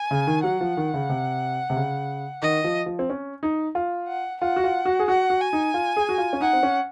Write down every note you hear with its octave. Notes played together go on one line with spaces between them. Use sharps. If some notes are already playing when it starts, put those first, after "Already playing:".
Already playing: G#5
C#3
D#3
F#3 F#5
F3
D#3
C#3
C3
C3
C#3
D#3 D#5
F3
F3
C4
C#4
D#4
F4
F#5
F4 F#5
F#4
F4
F#4
G#4
F#4 F#5
F#4
G#5
D#4
F4
G#4
F#4
F4
C#4
D#4 F#5
C4
C#4